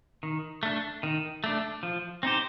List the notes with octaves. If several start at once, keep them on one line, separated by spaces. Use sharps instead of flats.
D#3
A3 D4
D#3
A3 D4
F3
C4 D#4 G4 C5